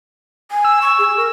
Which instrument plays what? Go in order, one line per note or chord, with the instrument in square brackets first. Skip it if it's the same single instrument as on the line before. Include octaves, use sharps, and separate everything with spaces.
[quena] G#5
[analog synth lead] E6
[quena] C#6
G#4
A#4